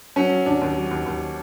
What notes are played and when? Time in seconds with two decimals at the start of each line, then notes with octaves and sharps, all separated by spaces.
0.16 F#3 C#4
0.31 F#3
0.46 D#2 D4
0.61 D#2
0.76 F#3
0.91 D#2
1.06 D#2